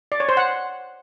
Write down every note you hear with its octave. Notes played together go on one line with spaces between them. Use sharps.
D5
C#5
C5
F#5